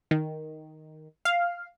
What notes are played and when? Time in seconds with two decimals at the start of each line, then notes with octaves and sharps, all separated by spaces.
0.11 D#3
1.25 F5